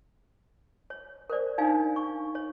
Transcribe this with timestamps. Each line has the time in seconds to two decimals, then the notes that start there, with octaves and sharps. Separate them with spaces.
0.90 C#5
1.30 A#4 C5 D5
1.58 D4 D#4 F5 G#5
1.95 D4 C#6
2.35 C#5